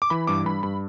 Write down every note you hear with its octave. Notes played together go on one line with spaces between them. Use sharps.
D6
E3 B5
G2 D6
G2 B5
G2 B5